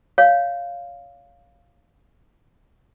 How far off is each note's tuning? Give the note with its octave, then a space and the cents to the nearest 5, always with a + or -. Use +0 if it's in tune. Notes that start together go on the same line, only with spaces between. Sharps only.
C#5 +25 F5 +0